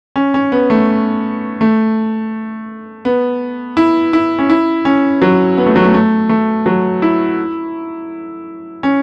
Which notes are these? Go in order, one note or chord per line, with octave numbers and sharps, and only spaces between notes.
C#4
C#4
B3
A3
A3
B3
E4
E4
C#4
E4
C#4
F#3
B3
A3
F#3
A3
A3
A3
F#3
E4
C#4